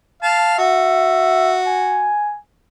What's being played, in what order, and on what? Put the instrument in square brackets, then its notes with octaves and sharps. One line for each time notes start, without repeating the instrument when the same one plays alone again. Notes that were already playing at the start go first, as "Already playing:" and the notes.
[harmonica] F5 A5
[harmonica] F#4 [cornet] E5
[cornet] G#5